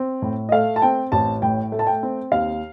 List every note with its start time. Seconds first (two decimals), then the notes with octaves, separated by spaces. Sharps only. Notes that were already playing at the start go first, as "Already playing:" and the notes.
Already playing: C4
0.22 A2
0.49 D#5
0.52 A3 F5
0.76 A5
0.82 C4 G5
1.12 A1 A5
1.42 A2 G5
1.72 A3
1.79 A5
1.87 G5
2.03 C4
2.32 D#2 F5